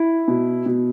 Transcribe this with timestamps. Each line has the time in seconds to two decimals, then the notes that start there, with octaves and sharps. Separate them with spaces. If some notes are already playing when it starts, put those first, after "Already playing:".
Already playing: E4
0.28 B2
0.66 B2